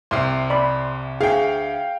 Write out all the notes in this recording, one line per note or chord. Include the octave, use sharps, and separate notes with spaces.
C2 C3 C6 F6 C7
D5 B5
D2 G#4 F5 G5